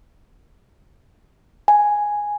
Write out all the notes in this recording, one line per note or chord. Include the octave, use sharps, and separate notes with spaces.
G#5